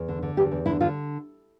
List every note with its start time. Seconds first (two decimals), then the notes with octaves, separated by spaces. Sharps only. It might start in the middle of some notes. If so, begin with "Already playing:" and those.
Already playing: E2
0.08 D3
0.22 D3
0.37 E2 G4
0.52 E2
0.66 D3 E4
0.81 D3 F4